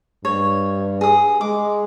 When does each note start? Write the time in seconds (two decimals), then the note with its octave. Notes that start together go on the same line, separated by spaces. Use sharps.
0.25 G2 C#5
1.01 G#4 D#6
1.41 G#3 D6